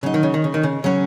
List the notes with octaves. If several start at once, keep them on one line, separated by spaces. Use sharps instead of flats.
C#3 F#3 D#4
D#3
C#3
D#3
C#3
D#3
C#3
C#3 F#3 C#4